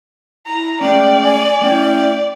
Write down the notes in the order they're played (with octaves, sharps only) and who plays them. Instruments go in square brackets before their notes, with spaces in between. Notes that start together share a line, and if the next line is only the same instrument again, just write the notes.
[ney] E4 [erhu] A#5
[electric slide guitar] G#3 A3 C#4 [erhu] D5 [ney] G5
[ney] G#5
[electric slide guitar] A3 C#4 E4 [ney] G5
[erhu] D5